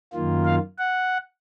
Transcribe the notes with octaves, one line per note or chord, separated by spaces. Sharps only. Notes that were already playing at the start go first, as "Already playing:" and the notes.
F#2 D#3 A#3 F4
F5
F#5